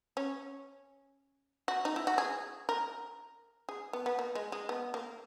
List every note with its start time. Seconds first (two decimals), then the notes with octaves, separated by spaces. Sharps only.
0.17 C#4
1.68 F#4
1.85 D#4
1.96 E4
2.07 F#4
2.18 G#4
2.69 A#4
3.69 G#4
3.93 B3
4.06 B3
4.19 A#3
4.35 G#3
4.52 G#3
4.69 B3
4.94 A#3